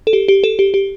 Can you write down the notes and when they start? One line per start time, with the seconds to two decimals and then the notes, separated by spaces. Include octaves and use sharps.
0.07 A4
0.13 G4
0.28 G4
0.44 A4
0.59 G4
0.74 G4